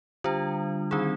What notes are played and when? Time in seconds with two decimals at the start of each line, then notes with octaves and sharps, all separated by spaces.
0.24 D3 G3 D4 F4
0.91 D#3 G3 C4 D#4 G#4